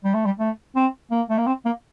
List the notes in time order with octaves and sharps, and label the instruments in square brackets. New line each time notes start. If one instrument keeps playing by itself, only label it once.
[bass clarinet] G3
A3
G3
A3
C4
A#3
A3
A#3
C4
A#3